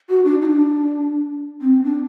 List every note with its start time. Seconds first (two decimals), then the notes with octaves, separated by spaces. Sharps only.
0.09 F#4
0.25 D4
0.42 D#4
0.45 D4
1.61 C4
1.84 D4